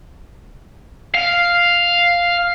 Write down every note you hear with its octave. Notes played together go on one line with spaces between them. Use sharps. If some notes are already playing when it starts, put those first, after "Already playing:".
F5